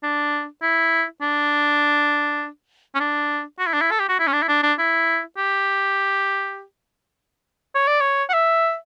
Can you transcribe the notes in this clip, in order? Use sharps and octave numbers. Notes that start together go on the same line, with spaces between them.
D4
E4
D4
C#4
D4
F#4
E4
D4
E4
A4
G4
F#4
E4
C#4
D4
E4
D4
D4
E4
G4
C#5
D5
C#5
F#5
E5